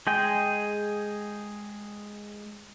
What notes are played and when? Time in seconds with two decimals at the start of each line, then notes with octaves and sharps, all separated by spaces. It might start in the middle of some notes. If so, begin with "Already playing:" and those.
0.07 G#3 G#4 G5 G#5